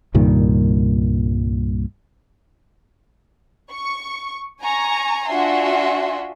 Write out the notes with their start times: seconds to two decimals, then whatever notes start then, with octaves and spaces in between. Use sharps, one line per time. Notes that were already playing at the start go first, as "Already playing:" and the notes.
0.14 C2 G2 A#2 D#3
3.72 C#6
4.62 G#5 A#5 C#6
5.28 D4 F4 F#4 E5 G#5 C6